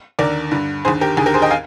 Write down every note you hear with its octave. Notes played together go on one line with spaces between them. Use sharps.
D#2 D3 A#4 D5
G2 D3
D#2 D3 G#4 C5
G4 A#4
D#2 D3 G#4
G4 A#4
G#4 C5
D#5 G5
F5 G#5